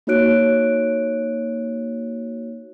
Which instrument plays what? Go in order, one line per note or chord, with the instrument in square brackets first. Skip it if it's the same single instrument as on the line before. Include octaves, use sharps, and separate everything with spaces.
[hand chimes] A#3 D#4 F#4 C#5 F#6 D7